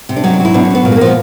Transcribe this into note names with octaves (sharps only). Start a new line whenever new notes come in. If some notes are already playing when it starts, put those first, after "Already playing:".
C3
D4
F#3 D#4
D4
F#3
E4
B2 D4
C#4
F#3 B3
A#2
A3
A#3
F3 B3